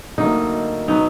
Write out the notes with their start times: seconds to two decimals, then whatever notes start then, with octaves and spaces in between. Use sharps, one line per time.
0.18 D2 D3 F#3 A#3 D#4
0.88 B2 F#3 B3 D#4